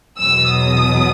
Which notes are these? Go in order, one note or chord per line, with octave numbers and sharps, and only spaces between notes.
E2 B2 F#3 E6
D#6